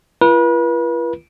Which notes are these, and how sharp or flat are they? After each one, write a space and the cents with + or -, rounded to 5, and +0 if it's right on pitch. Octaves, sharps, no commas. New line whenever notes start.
F4 -45 B4 -35